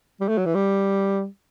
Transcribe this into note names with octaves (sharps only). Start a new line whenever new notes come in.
G3
A3
F#3
E3
G3